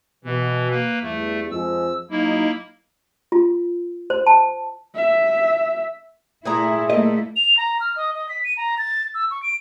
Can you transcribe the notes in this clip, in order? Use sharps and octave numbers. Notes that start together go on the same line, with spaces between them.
B2 E3
A#3 B4
E2 G2 A3
F2 F3 G#3 E6
F#3 A#3 D#4 E4
F4
C5
A5
E5
A#2 A3 E4 G#4 A#5
A3 A#3 E4 A#4 D#5
F7
A#5
F6
D#5
D#5
B6
D#7
A#5
A6
E6
C#6
D7